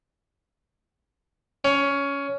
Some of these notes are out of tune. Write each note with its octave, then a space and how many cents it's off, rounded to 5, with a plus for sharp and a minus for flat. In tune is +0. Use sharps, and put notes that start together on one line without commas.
C#4 +15